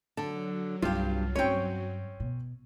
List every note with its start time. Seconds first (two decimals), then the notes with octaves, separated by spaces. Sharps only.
0.17 D3 F#3 A5
0.82 C2 G2 F4 G4
1.35 G2 C4 C#4 C#5 G5
2.20 B2